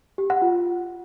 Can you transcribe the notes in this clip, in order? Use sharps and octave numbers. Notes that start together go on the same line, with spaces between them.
G4
F#5
F4